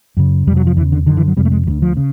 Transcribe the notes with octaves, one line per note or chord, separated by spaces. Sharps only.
F#2 C#3
F2 C3 F#3 G3
F3
E2 C#3 E3
D3
F#2 D3 D#3
E3
F#3
F2 C3 G3
A3
G#3
D2 D3 F#3
F3
C#3